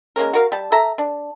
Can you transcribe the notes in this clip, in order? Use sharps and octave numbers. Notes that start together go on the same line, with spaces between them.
G#3 A#3 C#4 A#4
F#4 A#4 F5
G3 A5
A4 E5 A#5
D4